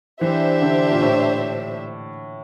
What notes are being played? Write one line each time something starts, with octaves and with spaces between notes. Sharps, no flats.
E3 D4 G4 C5 E5
D3
A#2
A2